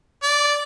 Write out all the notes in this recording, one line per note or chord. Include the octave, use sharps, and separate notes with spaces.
D5